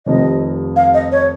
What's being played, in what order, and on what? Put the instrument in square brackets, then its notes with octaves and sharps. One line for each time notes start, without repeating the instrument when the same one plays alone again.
[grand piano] F1 F2 C3 D#3 [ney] D#5
[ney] F5
D#5
C#5